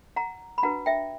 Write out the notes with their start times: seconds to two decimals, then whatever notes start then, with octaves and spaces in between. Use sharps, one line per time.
0.16 F#5 A#5
0.58 B5
0.63 D4 F#4 B4 F#5 A#5
0.86 E5 G5